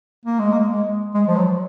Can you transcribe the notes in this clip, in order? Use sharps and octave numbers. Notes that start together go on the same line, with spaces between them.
A#3
G#3
A#3
G#3
G#3
F3
F#3